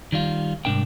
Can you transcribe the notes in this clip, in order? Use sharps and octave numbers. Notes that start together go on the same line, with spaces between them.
D#3 G3 F4
C2 G#2 C#3 D4 A#4 G5